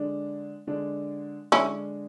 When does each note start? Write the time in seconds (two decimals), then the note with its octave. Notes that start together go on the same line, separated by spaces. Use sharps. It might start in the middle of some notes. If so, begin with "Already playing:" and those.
Already playing: D3 G#3 D4
0.67 D3 G#3 D4
1.52 D3 G#3 C#4 D4 E4